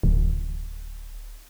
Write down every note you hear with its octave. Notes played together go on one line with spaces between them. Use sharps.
D1